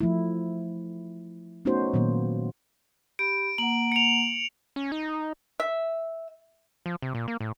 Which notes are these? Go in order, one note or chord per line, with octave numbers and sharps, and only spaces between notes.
F3 A3 E4
A3 B3 C#4 D#4 F#4 C5
A#2 D#3 F#3 A#3 B3
G4 B5 D7
A#3 F#5 F#7
C#7 F7
C#4
D#4
E5
F3
C3
A#2
A#3
A2